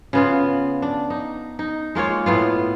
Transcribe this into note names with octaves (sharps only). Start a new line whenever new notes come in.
C#3 B3 F4
D4
D#4
D#4
G#3 A#3 F4 C#5
A2 B3 F4